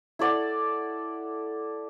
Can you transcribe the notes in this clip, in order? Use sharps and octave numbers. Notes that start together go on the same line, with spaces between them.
E4 A4 D5 F#5